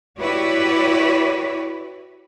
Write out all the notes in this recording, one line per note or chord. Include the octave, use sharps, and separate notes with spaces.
E4 F#4 G4 B4 C#5 D5